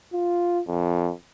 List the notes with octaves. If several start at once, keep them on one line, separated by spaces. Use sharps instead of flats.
F4
F2